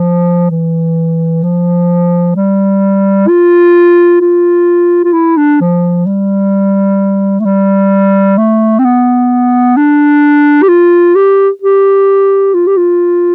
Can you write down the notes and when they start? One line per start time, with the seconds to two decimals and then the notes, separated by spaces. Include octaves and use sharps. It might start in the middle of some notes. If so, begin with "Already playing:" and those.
Already playing: F3
0.51 E3
1.43 F3
2.36 G3
3.28 F4
4.21 F4
5.04 F4
5.13 E4
5.37 D4
5.60 F3
6.06 G3
7.40 A3
7.45 G3
8.38 A3
8.79 C4
8.84 B3
9.77 D4
10.63 G4
10.68 F4
11.15 G4
11.62 G4
12.54 F4
12.67 G4
12.77 F4